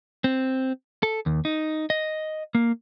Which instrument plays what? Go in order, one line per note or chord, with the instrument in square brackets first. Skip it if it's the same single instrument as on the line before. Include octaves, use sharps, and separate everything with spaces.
[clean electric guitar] C4
A4
D#2
D#4
D#5
A#3